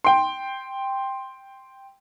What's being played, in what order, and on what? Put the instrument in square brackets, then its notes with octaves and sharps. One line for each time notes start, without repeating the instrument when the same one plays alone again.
[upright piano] G5 C6